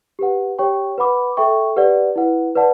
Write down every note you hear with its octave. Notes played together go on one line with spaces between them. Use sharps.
G4 B4 F#5
G4 C#5 G5 C#6
B4 F#5 B5 D6
A4 E5 G5 C#6
G4 B4 D5 F#5
E4 B4 F#5
B4 D5 F#5 A5